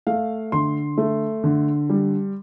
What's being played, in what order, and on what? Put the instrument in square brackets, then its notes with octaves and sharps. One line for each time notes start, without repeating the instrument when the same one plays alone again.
[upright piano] A3 F5
D3 C6
A3
D3
G3